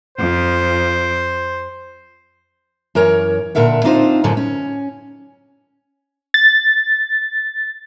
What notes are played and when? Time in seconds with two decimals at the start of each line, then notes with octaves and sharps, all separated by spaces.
0.17 F2 C5
2.95 F#2 E3 A#4 C#5
3.55 A#2 D3 A#4 E5 F#5
3.84 C4 D4 D#4 F4 B4 C5
4.24 F#2 A2 D3 F#3
4.37 C#4
6.34 A6